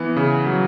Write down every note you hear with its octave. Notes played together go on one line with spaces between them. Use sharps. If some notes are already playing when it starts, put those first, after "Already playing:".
Already playing: E3 B3
C#3
F#3